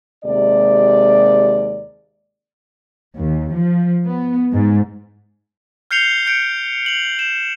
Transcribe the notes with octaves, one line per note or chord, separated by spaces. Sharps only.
D#2 C3 G#3 D5
D#2
F3
B3
G#2
F6 G6 C7 C#7 F7 G7
G6 C#7 D7
F7 F#7
E7